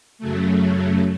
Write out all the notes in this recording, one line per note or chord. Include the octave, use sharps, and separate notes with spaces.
F#2 C#3 F#3 A3